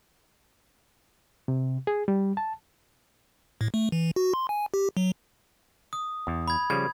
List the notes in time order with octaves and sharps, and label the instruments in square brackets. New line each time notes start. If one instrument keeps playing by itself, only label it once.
[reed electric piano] C3
G#4
G3
A5
[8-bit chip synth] A2
A3
E3
F#4
C6
G#5
G4
F#3
[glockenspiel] D#6
[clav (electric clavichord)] E2
[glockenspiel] B5 G#6
[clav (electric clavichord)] C#3 F3 G3 [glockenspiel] G#6